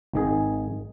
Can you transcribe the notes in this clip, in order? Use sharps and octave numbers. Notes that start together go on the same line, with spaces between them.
G#1 D#3 G#4